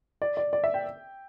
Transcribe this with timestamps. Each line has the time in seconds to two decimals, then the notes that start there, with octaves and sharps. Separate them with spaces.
0.22 D5
0.37 D5
0.53 D5
0.64 E5
0.74 G5